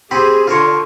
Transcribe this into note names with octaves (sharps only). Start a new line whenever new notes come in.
C4 G4 G#4 B5
D3 F4 A#4 C#5